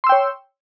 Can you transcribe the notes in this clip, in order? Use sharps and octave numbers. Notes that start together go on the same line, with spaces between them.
C#5 G5 C6 E6